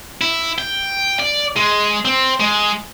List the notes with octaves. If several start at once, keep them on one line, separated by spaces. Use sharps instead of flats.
E4
G5
D5
G#3
C4
G#3